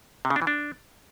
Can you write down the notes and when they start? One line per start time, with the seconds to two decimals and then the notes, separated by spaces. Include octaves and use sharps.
0.25 C3
0.30 C#3
0.36 D4
0.42 E3
0.47 D4